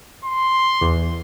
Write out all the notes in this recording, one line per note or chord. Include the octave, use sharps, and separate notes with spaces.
C6
E2